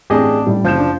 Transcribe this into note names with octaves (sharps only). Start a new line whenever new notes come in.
A1 C4 D4 G4 G#4 D#5
A2 G3
F#1 F3 G6 E7
D4